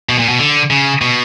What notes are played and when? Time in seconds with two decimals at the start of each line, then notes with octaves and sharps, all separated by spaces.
0.09 B2
0.19 A#2
0.29 B2
0.40 D3
0.70 C#3
1.02 B2